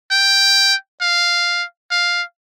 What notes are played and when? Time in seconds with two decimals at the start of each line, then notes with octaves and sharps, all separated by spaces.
0.12 G5
1.01 F5
1.91 F5